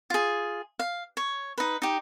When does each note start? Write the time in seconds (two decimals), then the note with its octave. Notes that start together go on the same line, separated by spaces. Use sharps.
0.10 F4 G#4
0.79 F5
1.17 C#5
1.58 D#4 B4
1.82 D#4 G4